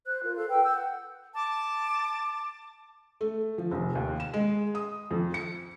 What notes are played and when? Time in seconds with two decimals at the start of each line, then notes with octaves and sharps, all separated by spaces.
0.06 C5 F#6
0.23 F4 A#4
0.37 A4 F5
0.49 B4 F5 G5 E6
0.63 E6 G6
0.75 F#5
1.33 A5 D6
3.21 A3
3.58 F3
3.71 F1
3.95 D#2
4.20 E7
4.34 G#3
4.75 D#6
5.11 F2
5.34 C#7